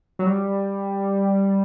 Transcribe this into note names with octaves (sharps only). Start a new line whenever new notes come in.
F#3
G3